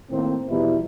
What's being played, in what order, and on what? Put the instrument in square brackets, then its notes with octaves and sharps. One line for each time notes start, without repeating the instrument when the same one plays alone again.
[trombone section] A2 D#3 A#3 C4
E2 B2 F3 G3 D#4 E4